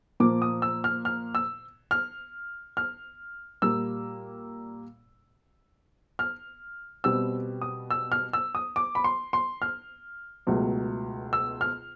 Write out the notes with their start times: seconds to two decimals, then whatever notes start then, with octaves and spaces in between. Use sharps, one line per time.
0.20 A#2 F3 A#3 D6
0.42 D#6
0.62 E6
0.84 F6
1.05 F6
1.35 E6
1.91 F6
2.77 F6
3.62 A#2 G3 A#3 E6
6.19 F6
7.04 B2 G3 C4 E6
7.61 D#6
7.90 E6
8.12 F6
8.33 E6
8.55 D#6
8.76 D6
8.95 B5
9.04 C6
9.33 C6
9.62 F6
10.47 C#2 B2 F#3 A3
11.33 E6
11.61 F6